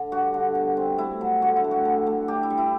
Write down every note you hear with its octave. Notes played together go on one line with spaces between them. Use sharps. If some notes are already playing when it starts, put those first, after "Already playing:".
Already playing: D3
G2 F#4
D3
B2
C4
A3 E4
F#3
D3 F#4
E4
A3
F#4
D3
A3
D4 G4
E4
G3
E4